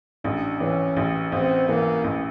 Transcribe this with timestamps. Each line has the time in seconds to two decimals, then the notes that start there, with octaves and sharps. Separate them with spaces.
0.24 A1 D4
0.60 E3 C#4
0.97 A1
1.32 A1 C4
1.69 E3 A#3
2.04 A1